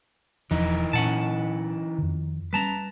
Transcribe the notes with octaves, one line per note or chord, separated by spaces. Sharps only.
E1 E2 E3 F3 D#4
A#2 C#4 F#5 A5
F2 D#3
G3 G#3 C#4 B4 A5 A#5